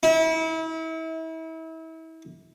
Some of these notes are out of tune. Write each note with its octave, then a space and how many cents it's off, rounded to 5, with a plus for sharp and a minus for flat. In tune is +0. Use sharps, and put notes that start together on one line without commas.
E4 -35